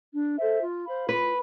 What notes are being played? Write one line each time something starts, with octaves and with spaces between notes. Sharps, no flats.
D4
A4 C5 E5
F4
C5 F5 B5
F4 B4